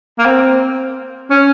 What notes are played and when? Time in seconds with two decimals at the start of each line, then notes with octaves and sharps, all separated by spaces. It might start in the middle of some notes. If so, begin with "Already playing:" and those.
0.19 A#3
0.25 C4
1.30 C#4